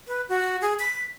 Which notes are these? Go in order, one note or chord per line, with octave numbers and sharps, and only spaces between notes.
B4
F#4
G#4
B6